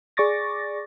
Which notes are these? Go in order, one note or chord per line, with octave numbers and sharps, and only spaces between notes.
G#4 D5 C#6 D6 A6 A#6